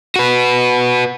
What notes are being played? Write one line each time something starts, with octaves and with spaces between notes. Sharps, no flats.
F#4 B4